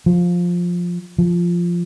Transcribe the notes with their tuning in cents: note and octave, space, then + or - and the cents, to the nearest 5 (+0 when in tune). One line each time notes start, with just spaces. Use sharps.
F3 +10
F3 -5